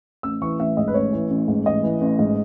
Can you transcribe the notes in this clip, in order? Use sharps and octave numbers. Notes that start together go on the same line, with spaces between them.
A1 E6
E3 C#6
A1 E5
G#2 D#5
B4
A1 C#5
E3
A1
G#2
A1 D#5
E3
A1
G#2